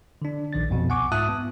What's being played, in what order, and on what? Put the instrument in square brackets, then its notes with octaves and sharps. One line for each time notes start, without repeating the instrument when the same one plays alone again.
[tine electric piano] D3 D4
A#1 D#3 D5 A6
C2 F2 B2
F#5 G#5 C#6 D6
G#2 F4 E5 A5 D#6 F#6
B3